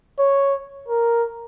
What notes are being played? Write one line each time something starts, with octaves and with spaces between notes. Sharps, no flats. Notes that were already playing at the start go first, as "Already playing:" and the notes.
C#5
A#4